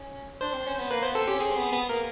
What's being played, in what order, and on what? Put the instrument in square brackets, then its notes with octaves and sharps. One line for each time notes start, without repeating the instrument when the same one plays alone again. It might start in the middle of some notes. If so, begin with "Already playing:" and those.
Already playing: [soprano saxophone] C#4
[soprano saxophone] D4 [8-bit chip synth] C5
[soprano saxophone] C4
C#4
B3
[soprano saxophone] A#3 [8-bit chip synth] B4
[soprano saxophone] B3 [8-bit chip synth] C5
[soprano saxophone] C4 [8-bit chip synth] A4
[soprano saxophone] C#4 [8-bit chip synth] G4
[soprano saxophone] C4 [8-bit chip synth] G#4
[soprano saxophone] C4
B3
B3
[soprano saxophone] A#3 [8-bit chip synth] A#4